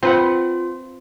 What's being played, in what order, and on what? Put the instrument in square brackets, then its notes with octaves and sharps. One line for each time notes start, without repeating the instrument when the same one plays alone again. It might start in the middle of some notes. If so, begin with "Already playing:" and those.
[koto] C4 B4 F#5 [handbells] F4